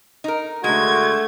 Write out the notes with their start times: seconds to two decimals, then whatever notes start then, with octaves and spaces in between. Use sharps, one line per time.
0.24 D#4 A#4
0.64 D3 G#3 A3 F#4 G#6